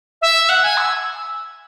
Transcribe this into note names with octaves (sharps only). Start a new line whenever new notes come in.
E5
F#5
G#5
E6